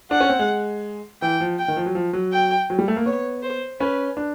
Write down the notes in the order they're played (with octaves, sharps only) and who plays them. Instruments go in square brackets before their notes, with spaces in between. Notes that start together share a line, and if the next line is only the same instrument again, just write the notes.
[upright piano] D4 [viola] F#5
[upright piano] C#4
C4
G#3
[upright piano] E3 [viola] G5
[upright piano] F3
[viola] G5
[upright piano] D#3
F3
F#3
F3
F#3
[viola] G5
[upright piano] F#3
G3
A3
A#3
[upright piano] B3 [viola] C#5
[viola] C5
[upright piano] C#4 [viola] B4
[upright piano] D4